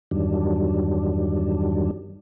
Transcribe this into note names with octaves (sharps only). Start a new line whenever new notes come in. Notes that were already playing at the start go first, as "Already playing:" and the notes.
E2 G2 D#3 F#3 G3 D4